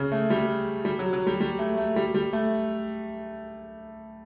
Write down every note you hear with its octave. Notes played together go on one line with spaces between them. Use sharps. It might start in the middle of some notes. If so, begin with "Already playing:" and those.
Already playing: C#3
A3
G3
G3
F#3
F#3
G3
G3
A3
A3
G3
G3
A3